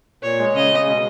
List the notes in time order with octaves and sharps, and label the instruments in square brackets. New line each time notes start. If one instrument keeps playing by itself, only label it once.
[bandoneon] A#2 [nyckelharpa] C#5
[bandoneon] G#3
[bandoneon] C#3 [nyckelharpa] D#5
[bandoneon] G#3
B2